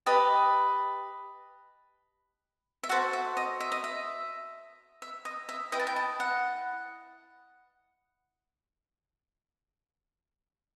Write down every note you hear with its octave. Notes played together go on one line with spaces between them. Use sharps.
G4 B4 D#5 A5
E5
F#4 A4 C5 F#5
E5
D#5
E5
D#5
E5
E5
D#5
E5
E4 B4 D#5 G5
A5
G5
A5
F#5